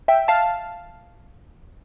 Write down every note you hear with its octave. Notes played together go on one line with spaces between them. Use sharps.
E5 G5
F5 A5